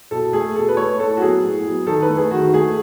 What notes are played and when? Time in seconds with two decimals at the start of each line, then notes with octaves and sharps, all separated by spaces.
0.11 B2 A4
0.33 A3 G#4
0.56 B2 A4
0.69 B4
0.77 A3 C#5
0.99 A2 A4
1.17 F#4
1.21 F#3 B3 G#4
1.43 A2
1.65 F#3 B3
1.87 D#3 A4
2.02 B4
2.09 A3
2.17 G#4
2.31 D#3 F#4
2.53 A3 G#4